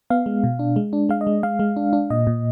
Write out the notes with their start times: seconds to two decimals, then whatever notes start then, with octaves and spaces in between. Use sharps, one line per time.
0.10 B3 F5
0.26 G#3
0.44 B2
0.59 D4
0.76 G#3
0.93 D4
1.09 G#3 F5
1.21 D#5
1.27 G#3
1.43 G#3 F5
1.59 G#3
1.76 D4
1.93 D4
2.10 A#2 D#5
2.27 A#2